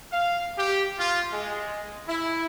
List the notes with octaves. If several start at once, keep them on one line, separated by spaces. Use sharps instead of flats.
F5
G4
F4
G#3
E4